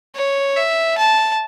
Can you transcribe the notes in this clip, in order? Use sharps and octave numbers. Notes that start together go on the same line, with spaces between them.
C#5
E5
A5